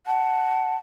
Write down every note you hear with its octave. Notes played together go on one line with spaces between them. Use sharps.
F#5 A5